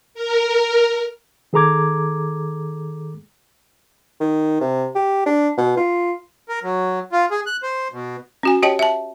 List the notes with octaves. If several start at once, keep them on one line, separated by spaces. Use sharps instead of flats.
A#4
D#3 G#4 A4 A#5 D6 G#6
D#3
C3
G4
D4
B2
F4
A#4
F#3
F4
G#4
F#6
C5
B2
C#4 F#4 G#5
G4 C#5 D#5 G5 A5
E5 A5